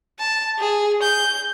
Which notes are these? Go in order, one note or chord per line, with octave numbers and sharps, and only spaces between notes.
A5
G#4
G6